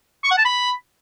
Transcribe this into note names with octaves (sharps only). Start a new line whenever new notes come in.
C#6
F#5
A5
B5